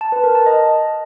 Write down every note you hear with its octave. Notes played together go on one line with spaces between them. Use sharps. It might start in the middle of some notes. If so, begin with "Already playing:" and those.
A5
B4
A#4
A5
D#5